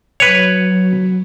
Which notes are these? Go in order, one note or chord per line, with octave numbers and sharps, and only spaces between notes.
F#3 B4 C#5